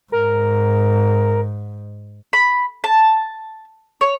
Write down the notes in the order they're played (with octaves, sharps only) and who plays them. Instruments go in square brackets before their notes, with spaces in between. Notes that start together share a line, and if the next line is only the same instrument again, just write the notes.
[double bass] G#2 [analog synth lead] A#4
[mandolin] B5
A5
C#5